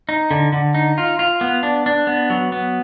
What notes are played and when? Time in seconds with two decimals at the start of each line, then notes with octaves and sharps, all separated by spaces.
0.09 D#4
0.31 D3
0.53 D3
0.75 D#4
0.98 F4
1.19 F4
1.41 B3
1.63 D4
1.86 D4
2.07 B3
2.30 F#3
2.52 B3